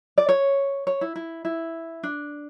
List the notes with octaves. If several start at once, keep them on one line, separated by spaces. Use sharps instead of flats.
D5
C#5
C#5
E4
E4
E4
D4